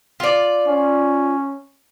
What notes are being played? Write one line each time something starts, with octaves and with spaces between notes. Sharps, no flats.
F4 D5
C#4